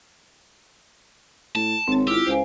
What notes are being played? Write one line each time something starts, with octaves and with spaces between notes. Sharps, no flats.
A2 A5
G#1 C4 C#5
E4 F4 G4
C#2 C5 F5 G#5